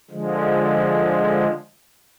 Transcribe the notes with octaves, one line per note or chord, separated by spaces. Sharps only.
D3 F3 G#3